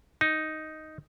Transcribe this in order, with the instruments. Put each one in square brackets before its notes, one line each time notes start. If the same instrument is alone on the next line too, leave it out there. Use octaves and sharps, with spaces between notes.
[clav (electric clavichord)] D#4